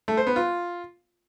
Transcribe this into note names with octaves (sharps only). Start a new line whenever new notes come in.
A3
C5
B3
F4